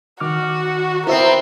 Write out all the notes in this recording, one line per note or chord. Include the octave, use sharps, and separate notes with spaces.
D#3 F#4 D6 F6
B3 C4 E4 A#4 C5 E5